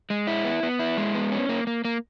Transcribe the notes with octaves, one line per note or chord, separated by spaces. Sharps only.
G#3
E4
B3
B3
E4
G#3
B3
C#4
A#3
A#3
A#3